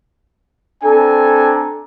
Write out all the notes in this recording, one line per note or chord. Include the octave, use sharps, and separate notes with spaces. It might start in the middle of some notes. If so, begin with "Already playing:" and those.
C4 D4 A4 G#5 A#5